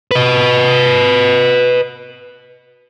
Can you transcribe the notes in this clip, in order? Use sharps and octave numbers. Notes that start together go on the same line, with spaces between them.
B4 D#5